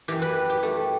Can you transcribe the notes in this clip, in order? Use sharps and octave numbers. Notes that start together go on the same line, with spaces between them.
F#2 E3 G4
B4
G4
A3